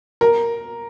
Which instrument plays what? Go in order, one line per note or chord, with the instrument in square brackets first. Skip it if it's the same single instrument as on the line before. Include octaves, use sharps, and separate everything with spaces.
[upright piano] A#4